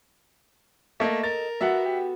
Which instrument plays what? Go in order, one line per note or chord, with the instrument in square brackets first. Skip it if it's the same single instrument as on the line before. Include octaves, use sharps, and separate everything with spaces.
[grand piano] A3 A#3 [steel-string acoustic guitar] A4 D#5 [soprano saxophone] E5
[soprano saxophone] A#4 [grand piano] A6
[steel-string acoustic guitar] B3 F#4 A4 [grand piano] E5 F#5
[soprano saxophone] G4